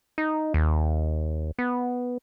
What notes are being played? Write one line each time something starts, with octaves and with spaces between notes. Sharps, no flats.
D#4
D#2
B3